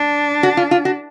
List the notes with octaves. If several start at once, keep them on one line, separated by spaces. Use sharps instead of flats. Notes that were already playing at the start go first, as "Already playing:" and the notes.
Already playing: D4
F#4
F4
F4
F#4